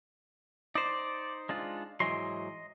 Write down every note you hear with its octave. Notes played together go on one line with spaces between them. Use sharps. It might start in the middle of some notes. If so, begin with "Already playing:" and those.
D#4 C5 D5
G#3 D4 F4
G#2 E3 F#3 D#5 C6